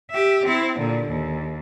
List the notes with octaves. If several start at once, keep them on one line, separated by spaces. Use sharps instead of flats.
G4 E5
C4 E4
A#2 D3
D#2